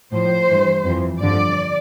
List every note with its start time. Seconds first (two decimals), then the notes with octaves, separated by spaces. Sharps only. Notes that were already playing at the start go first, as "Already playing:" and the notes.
0.12 A2 F3 C5
0.48 G2 E3
0.84 F2
0.89 E3
1.20 G2 D3 F3 D5